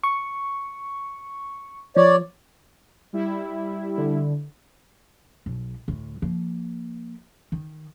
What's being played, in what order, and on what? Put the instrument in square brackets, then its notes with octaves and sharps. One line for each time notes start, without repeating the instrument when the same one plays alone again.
[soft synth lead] C#6
[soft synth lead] F3 [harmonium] C#5 D5
[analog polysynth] G3 E4
[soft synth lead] D3
[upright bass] B1
D2 A2
F3 A#3
D#3